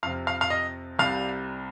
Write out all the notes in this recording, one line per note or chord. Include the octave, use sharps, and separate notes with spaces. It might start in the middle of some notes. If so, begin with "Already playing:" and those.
F2 C3 F3 F5
F5
F5
D#5
C2 C3 G3 F5